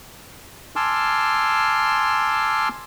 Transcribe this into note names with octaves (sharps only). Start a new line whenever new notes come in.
G#5 A5 C6 D6 E6 F6